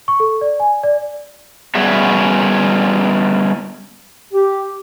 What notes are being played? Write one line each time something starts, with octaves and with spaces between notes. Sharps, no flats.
C#6
A4
D5
G#5
D5
G3 B3 C#4 F#4 G#4 E5
G4